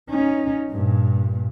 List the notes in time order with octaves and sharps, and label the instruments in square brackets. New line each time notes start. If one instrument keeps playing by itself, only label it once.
[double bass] C#4 D#4
G2 A#2